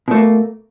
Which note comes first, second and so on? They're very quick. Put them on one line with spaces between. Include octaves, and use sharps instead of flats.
B2 A3 A#3